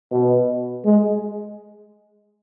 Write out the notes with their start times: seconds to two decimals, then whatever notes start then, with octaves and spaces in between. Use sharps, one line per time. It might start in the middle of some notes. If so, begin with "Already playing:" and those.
0.11 B2
0.85 G#3